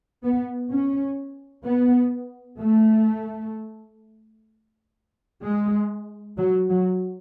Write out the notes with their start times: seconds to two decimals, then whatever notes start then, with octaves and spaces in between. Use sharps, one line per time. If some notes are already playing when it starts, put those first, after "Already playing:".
0.23 B3
0.71 C#4
1.65 B3
2.60 A3
5.43 G#3
6.38 F#3
6.69 F#3